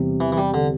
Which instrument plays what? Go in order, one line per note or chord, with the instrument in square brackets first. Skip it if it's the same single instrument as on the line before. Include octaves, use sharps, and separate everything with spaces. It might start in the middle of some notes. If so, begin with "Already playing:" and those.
Already playing: [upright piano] E2 C3 G3
[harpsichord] E3
E3
G3
D3